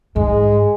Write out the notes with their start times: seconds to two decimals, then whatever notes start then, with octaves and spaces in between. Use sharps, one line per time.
0.16 G#2 G#3